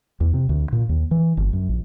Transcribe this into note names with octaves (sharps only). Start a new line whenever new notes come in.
E2
C3
D2
A#2
D#2
E3
G1
F#2
A#1